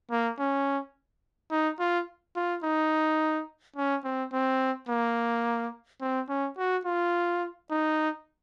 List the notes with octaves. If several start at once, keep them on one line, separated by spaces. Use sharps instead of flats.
A#3
C#4
D#4
F4
F4
D#4
C#4
C4
C4
A#3
C4
C#4
F#4
F4
D#4